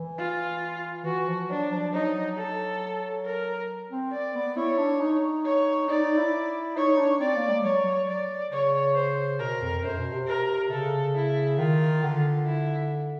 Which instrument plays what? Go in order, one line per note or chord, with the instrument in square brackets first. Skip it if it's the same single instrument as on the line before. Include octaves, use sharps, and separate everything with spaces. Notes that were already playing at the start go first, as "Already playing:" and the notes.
Already playing: [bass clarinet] E3
[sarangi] F4
[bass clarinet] E3 [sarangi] F#4
[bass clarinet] F3
[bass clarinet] F#3 [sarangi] D4
[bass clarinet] F3
[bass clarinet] F#3 [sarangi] D#4
[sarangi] A4
A#4
[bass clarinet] C4
[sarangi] D5
[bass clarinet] B3
[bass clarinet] E4 [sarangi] C#5
[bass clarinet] D4
D#4
[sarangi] C#5
[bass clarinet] D#4 [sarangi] D5
[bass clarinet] D#4
E4
[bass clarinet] D#4 [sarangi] C#5
[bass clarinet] D4
[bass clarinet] C4 [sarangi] D5
[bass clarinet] A#3
G#3
[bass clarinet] F#3 [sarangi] C#5
[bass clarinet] F#3
[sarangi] D5
[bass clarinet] C#3 [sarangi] C#5
[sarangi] C5
[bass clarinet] B2 [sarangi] A#4
[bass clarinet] F2
[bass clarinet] F#2 [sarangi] C5
[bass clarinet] B2
C3
[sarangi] A#4
[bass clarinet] C#3 [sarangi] A4
[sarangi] E4
[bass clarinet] D#3 [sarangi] F4
[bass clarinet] D3
[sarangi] E4